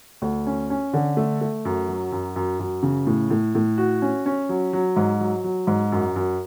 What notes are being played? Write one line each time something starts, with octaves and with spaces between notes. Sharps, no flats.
D2
C#4
C#4
D3
A3
A3
F#2
F#3
F#2
F#2
F#2
C#3
A2
A2
A2
F#4
C#4
C#4
F#3
F#3
G#2
F#3
F#3
G#2
F#2
F#2